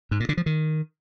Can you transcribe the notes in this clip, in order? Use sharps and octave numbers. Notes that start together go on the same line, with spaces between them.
G#2
A#2
D3
F3
D#3